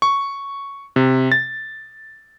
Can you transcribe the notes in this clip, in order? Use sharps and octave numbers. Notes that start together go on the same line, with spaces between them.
C#6
C3
A6